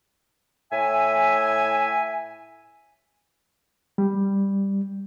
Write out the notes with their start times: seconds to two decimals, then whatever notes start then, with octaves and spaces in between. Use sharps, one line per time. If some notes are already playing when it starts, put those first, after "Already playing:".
0.72 A2 E5 G#5
3.98 G3